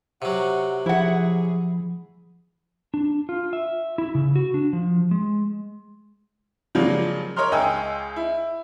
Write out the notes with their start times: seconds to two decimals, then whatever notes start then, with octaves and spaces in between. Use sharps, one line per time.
0.22 C3 F#3 F#5
0.86 F3 E4 G#4 F#5
2.94 D4
3.29 F4
3.53 E5
3.98 E4
4.15 C#3
4.36 F#4
4.54 D4
4.73 F3
5.11 G#3
6.75 C#3 F3 F#3 G#3 A#3 D4
7.36 A#4 C#5 D#5 A#5 C6 F6
7.52 C#2 D#5 G5 G#5 E6
8.16 E4